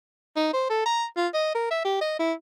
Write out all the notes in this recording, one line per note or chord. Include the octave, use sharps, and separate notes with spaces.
D#4
C5
A4
A#5
F4
D#5
A#4
E5
G4
D#5
E4